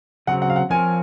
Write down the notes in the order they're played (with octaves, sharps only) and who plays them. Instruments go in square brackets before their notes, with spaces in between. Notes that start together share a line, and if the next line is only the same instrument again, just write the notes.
[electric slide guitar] C#3 F#3 C4 [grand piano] F#5
[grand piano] F#5
F5
F#5
[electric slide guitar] F3 C4 F4 A#4 C#5 [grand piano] G#5